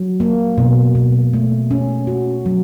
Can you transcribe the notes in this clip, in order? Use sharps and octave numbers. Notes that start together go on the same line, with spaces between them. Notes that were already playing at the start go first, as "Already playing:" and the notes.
Already playing: F#3
A#3
B2
B2
A3
C#4
F#4
F#3